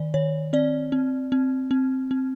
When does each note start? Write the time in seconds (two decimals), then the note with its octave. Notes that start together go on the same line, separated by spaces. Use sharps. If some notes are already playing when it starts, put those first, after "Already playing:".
Already playing: D#3 D5
0.14 D#3 C#5
0.53 C4 D5
0.92 C4
1.32 C4
1.71 C4
2.11 C4